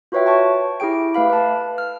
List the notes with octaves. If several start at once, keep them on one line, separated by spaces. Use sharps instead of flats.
F4 F#4 B4 C#5 E5 G5
G5 A5 C#6
E4 G4 G#4 G5 D7
A3 B4 F5 B5
B4 A5
F6